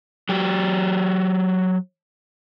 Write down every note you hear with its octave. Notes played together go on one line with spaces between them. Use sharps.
F#3 G4